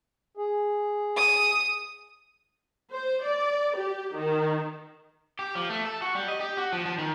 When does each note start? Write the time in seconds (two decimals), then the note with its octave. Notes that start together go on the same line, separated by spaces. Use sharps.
0.37 G#4
1.17 D#6
2.92 C5
3.23 D5
3.76 G4
4.15 D#3
5.39 G4
5.55 F3
5.69 A3
5.85 A4
6.02 F#4
6.15 G3
6.28 D#5
6.41 G4
6.58 F#4
6.73 F3
6.86 F3
6.98 D#3